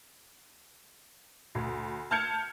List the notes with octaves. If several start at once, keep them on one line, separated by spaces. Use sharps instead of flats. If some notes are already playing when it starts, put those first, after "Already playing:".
D2
A5 F6 G6 G#6 C#7